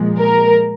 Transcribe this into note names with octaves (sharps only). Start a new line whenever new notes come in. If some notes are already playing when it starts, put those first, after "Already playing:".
Already playing: A#2 F3 G#3
A#4